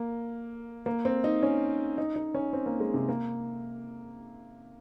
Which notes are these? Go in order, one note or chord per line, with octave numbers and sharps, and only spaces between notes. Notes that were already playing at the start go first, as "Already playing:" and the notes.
Already playing: A#3
A#3
C4
D#4
C#4
D#4
D#4
C#4
C4
A#3
G#3
C3
A#3